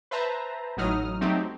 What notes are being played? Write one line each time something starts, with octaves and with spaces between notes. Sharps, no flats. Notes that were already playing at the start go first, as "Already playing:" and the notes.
B4 C5 E5 A5 A#5
A1 A2 F#3 D#4 D#6 F6
F#3 A3 C4 D#4 G4